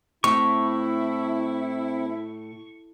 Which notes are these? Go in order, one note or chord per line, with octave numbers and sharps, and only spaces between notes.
A2 C4 E4 C#6